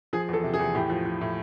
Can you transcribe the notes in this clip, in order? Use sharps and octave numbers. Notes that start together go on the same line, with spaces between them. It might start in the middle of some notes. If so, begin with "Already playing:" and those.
F3 G#4
E2 A4
C3
G#4
E2
A2 G4
F3
F3
A2